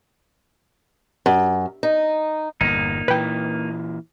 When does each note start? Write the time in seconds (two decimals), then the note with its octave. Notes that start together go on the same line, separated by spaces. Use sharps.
1.26 F#2
1.83 D#4
2.61 G1 E2 A#2 A#3 D#4
3.08 A#2 E3 B4 G5